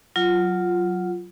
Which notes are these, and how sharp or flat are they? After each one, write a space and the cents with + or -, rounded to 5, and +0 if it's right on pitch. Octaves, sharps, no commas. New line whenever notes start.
F#3 +0 F4 +0